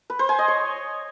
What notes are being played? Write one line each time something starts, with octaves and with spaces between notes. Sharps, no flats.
B4
C5
G#5
D#5
C#5